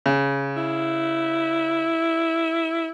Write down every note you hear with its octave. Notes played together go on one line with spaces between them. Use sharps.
C#3
E4